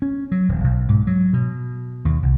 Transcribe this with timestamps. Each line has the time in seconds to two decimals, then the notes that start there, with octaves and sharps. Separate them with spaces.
0.02 C#4
0.32 F#3
0.49 D#1
0.64 B1
0.89 G#2
1.07 F#3
1.33 B2
2.05 D#2
2.22 C2